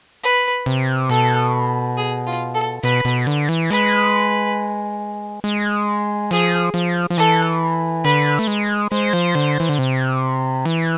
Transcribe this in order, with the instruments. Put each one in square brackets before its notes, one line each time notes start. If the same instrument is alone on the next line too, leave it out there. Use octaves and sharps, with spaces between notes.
[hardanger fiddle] B4
[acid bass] C3
[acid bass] B2 [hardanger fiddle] A4
[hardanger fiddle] G#4
F4
A4
[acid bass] B2 [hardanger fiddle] B4
[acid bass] B2
D3
E3
[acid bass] G#3 [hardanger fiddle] B4
[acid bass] G#3
[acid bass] F3 [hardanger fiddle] G#4
[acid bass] F3
F3
[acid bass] E3 [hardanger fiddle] A4
[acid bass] D3 [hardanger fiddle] B4
[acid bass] A3
G#3
[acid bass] G#3 [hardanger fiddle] C5
[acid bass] F3
D3
E3
D3
C3
E3